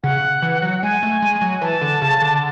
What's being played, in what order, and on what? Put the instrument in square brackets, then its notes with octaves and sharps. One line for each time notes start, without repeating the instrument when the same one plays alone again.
[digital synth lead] C#3 [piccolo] F#5
[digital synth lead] E3
F#3
[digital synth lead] G#3 [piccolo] G#5
[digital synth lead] A3
G#3
F#3
[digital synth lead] E3 [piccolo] A5
[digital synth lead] D3
C#3
D3